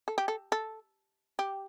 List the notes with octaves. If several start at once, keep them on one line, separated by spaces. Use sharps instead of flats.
A4
G4
A4
A4
G4